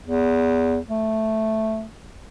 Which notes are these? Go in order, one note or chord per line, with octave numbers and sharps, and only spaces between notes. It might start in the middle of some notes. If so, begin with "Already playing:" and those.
E2
A3